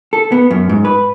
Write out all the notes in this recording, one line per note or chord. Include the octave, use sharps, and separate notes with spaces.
A4
B3
F#2
G#2
B4